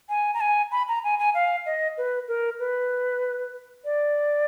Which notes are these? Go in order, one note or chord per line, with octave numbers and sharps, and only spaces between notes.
G#5
A#5
G#5
B5
A#5
G#5
G#5
F5
D#5
B4
A#4
B4
D5